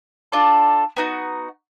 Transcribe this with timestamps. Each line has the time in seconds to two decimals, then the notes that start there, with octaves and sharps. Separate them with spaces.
0.32 D4 F4 A4 D5
0.97 B3 D#4 F#4